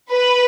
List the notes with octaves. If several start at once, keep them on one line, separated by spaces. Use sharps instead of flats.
B4